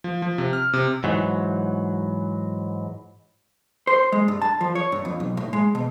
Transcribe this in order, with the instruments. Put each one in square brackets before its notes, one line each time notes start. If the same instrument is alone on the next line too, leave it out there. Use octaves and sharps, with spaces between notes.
[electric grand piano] F3
F3
C3
F6
C3
[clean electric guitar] G#2 E3 F#3
[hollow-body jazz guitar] C5
G#3
G2
A5
F3
C#5
G2
F2
B1
A2
G#3
B2